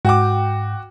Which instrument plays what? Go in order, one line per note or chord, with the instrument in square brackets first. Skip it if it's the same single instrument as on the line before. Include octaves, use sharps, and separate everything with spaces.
[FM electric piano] G#2 G5 [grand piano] F#4 D6